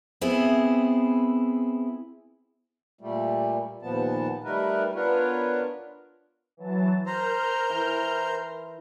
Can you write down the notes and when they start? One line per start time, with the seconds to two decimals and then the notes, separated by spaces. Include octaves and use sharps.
0.21 B3 C4 E4 G#4
3.01 A#2 G3 A3
3.82 D#2 A#2 F3 B3 A5
4.44 G3 A3 D#4 A#4 B4
4.95 B3 D4 F4 A#4 B4 C#5
6.57 E3 F#3 A5
7.06 A#4 C5 A#5 F6 G6
7.70 E3